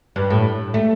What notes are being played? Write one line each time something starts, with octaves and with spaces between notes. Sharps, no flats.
G2
A2
A3